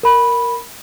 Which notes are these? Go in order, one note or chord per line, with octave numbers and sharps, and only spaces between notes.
A#4 B5